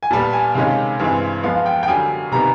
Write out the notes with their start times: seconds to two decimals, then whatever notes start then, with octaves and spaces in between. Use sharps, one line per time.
0.03 G#5
0.11 A#2 G3 B3 A5
0.33 G#5
0.55 C3 D#3 G#3 C#4 F5
0.99 G2 E3 G#3 C4
1.43 F3 G#3 B3 F5
1.66 G5
1.83 G5
1.88 F#2 D3 G3 G#5
2.32 C3 D#3 G3 B3 A#5